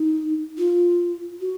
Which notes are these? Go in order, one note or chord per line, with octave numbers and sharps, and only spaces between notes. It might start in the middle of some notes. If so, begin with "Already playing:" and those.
Already playing: D#4
F4
F#4